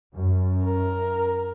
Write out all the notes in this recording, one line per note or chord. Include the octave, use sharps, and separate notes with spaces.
F#2
A#4